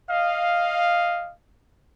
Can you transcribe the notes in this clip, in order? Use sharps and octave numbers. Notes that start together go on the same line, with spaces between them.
D#5 F5